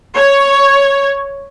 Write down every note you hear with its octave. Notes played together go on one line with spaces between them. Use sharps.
C#5